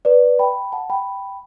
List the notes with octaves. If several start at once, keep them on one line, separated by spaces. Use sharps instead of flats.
B4 D5
G5 B5
F#5 A5
G5 B5